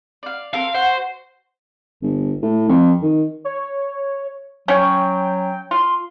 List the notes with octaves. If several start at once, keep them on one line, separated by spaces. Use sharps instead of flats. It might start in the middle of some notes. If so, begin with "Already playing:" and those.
D5 F5
C4 A4 A#4 F5
F#4 C5
G1
A2
F2
D#3
C#5
F#3 C#4 C#5 G5
F4 C6